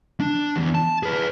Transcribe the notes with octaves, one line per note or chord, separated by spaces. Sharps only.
D4
E2
A5
G#4 B4